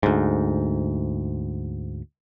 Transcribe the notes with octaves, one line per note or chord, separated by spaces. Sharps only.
D2 G#2